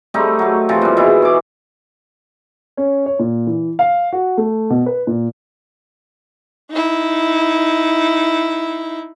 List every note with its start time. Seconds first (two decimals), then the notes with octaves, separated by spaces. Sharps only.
0.14 G3 A3 C4 D#4
0.39 F#3 A3
0.69 C3 E3 F3
0.82 A#2 G3
0.97 B2 E3 E4 G#4
1.22 C#6 D6
2.77 C#4
3.06 C#5
3.19 A#2
3.47 E3
3.79 F5
4.12 F#4
4.37 A3
4.70 B2
4.86 B4
5.07 A#2
6.71 D#4 E4